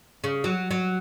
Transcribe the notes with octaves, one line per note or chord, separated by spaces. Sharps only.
C#3
F#3
F#3